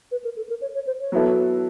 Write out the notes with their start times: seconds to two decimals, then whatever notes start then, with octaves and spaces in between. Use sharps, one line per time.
0.11 B4
0.24 A#4
0.36 A4
0.49 A#4
0.61 C#5
0.74 C#5
0.87 C5
1.00 C#5
1.12 F#3 B3 E4 A4